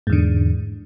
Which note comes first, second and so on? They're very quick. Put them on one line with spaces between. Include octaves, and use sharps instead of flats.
G#2 E2 D3